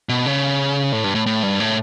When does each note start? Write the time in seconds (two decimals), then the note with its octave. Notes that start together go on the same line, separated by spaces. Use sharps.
0.09 B2
0.26 C#3
0.92 A2
1.04 G2
1.15 A2
1.26 A2
1.43 G2
1.60 A2